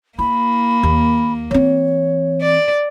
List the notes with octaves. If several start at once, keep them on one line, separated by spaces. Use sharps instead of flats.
A#3 E4 B5
D#2
E3 C4 C#5
D5